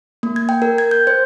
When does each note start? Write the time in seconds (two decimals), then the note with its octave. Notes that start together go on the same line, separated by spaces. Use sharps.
0.23 A#3
0.36 G#6
0.49 G5
0.62 A#4
0.78 G#6
0.91 G6
1.07 C5